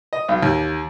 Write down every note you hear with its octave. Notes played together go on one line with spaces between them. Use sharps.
D#5
B1
D#2